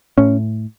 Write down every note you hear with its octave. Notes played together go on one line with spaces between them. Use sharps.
A2 C#4